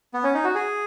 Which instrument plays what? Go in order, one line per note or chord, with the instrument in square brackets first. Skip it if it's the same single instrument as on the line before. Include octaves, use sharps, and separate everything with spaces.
[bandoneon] B3
C#4
D#4
F#4
G#4